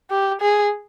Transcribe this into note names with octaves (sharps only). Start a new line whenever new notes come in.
G4
G#4